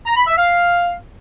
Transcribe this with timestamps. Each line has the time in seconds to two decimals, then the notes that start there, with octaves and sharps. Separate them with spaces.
0.06 A#5
0.17 B5
0.27 E5
0.38 F5